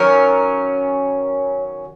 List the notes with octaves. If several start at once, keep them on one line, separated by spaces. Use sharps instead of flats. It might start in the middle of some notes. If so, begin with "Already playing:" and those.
Already playing: D#3 F#3 C#4 A#4 C#5